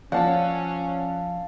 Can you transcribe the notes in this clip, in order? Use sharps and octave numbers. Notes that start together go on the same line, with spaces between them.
F3 C#4 D5 F5 F#5 A5 E6